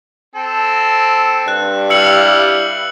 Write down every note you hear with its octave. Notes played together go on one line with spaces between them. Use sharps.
C4 A4
G2 F#6
G3 E4 F5 E6 C#7 F#7